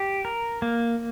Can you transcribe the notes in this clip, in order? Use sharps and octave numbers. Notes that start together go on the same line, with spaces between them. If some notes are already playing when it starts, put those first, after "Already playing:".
Already playing: G4
A#4
A#3